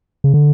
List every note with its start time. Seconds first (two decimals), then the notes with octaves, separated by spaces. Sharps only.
0.24 C#3
0.34 D3